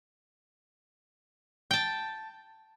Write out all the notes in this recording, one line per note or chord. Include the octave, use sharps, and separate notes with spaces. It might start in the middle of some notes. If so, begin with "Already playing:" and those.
G5 A5